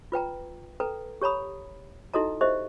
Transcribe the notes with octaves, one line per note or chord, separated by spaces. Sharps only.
F4 B4 G5 A#5
A4 B4 G5 A#5
G4 C#5 A#5 B5 D#6
D#4 E4 F#4 A4 D#5 A#5
G4 C5 D#5 E5